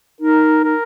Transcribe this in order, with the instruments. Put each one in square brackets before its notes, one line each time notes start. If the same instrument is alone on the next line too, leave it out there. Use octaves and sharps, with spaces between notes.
[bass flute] D#4 [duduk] A#4
[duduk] A#4